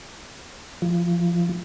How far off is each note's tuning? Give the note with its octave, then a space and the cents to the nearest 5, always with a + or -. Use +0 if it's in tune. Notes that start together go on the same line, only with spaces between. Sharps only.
F3 -15